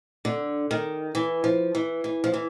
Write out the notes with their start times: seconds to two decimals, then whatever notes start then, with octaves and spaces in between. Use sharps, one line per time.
0.25 D3
0.71 D#3
1.15 E3
1.44 F3
1.75 E3
2.04 E3
2.24 F3
2.34 E3